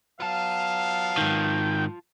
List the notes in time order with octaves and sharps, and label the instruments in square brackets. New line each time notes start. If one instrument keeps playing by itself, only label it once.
[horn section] F#3 B3 F5 [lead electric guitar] F4 A5
[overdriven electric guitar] G#2 D#3 [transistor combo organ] G5